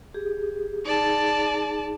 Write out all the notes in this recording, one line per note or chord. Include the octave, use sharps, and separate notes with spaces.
G4 G#4
D#4 G#4 D5 A5